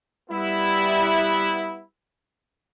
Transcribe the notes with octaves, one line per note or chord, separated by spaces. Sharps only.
G3 B3 E4